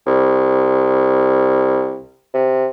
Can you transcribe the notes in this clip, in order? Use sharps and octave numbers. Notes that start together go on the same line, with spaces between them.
C2
C3